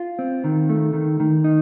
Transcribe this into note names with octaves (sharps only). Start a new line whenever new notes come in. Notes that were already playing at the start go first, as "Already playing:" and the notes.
Already playing: F4
C4
D#3
A3
D#3
D#3
D#4